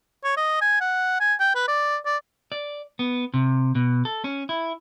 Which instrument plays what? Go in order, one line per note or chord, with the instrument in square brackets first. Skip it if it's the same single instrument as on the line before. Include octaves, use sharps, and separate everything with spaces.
[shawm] C#5
D#5
G#5
F#5
G#5
G5
B4
D5
D5
[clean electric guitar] D5
B3
C3
B2
A4
C#4
E4